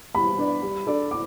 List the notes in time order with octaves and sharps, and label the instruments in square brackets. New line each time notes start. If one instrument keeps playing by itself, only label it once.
[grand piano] G3 [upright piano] B5
[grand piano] D4 B4 D5
G3
D4 A4 D5
[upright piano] D6